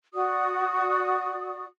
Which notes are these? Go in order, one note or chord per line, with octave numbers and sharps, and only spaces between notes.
F#4 D5 D#6